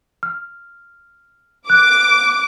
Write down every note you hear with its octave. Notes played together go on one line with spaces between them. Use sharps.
F6
D6 F#6